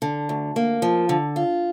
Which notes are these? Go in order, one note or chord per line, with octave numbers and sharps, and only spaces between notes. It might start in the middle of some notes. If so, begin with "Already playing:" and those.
D3
D2
A#3
F3
D3
F4